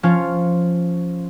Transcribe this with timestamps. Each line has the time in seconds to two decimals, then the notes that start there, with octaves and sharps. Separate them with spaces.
0.03 F3 C#4 F4